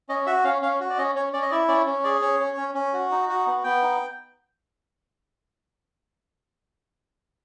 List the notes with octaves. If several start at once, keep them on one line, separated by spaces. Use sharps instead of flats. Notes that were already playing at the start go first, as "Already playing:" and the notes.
C#4 D#5
F#4 E5
C#4 F5
C#4 F5
F#4
D5
C#4 D#5
C#4 C#5
C#4 D5
D#5
E4 D5
C#4 D5
C#4
G#4 D5
C#4 C#5
C#4
C#4
C#4
F#4
D#4
F#4
B3
B3 G5
D#4